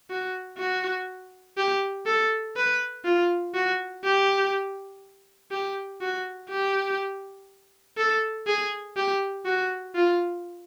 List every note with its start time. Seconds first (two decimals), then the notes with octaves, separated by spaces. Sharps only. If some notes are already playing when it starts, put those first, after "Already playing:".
0.10 F#4
0.58 F#4
1.57 G4
2.06 A4
2.56 B4
3.05 F4
3.54 F#4
4.04 G4
5.51 G4
6.01 F#4
6.50 G4
7.97 A4
8.47 G#4
8.96 G4
9.45 F#4
9.95 F4